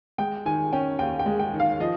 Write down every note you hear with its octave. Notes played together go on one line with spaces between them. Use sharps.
G#3 G5
D#3 G#5
C#4 G5
D#2 G5
G5
G#3
G5
D#3
F5
F3 D#5